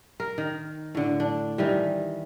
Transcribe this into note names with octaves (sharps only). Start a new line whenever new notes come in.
A#4
D#3
A2 D3
D4
D#3 E3 G3